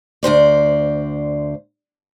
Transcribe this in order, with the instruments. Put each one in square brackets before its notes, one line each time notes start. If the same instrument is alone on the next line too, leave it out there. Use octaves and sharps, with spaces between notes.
[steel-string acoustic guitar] D2 A#2 C5 D5